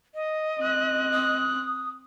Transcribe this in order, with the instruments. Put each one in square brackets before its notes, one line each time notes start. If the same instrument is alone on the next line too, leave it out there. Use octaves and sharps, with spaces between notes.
[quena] D#5
[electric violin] C4 F#6
[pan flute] D#6